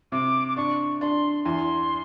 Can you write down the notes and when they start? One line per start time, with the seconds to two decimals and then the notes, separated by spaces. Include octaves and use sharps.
0.12 C3 D6
0.48 D6
0.57 D4 C#6
1.01 D4 C6
1.45 E2 C6